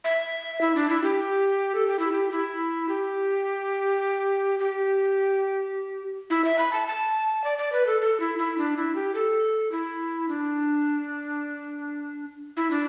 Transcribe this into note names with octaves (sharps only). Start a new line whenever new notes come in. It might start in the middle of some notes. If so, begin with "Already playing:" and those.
E5
E4
D4
E4
G4
A4
G4
E4
G4
E4
G4
G4
E4
E5
B5
A5
A5
D5
D5
B4
A4
A4
E4
E4
D4
E4
G4
A4
E4
D4
E4
D4